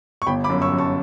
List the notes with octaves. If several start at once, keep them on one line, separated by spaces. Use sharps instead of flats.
C#6
G1 G5 B5
B5 D6
F#2
C#6 E6
F#2
A5 C#6